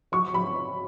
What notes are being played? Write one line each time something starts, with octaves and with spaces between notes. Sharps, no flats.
F#3 C#6
F#3 B5